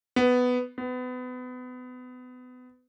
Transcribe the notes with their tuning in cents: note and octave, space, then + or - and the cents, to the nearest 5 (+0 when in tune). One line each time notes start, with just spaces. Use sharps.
B3 +10
B3 +30